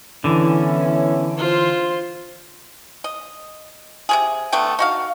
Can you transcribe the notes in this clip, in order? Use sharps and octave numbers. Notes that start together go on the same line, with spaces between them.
D3 E3 B3 C#4 E4
F4 C5
D#5
C3 F#3 G#4
D3 A3 B3 G5
D#4 F#4 F5